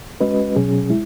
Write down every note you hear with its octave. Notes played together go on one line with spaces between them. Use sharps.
G#3 C#4 F#4 B4 D#5
B2 F#3 C#4 G#4
G#3 E4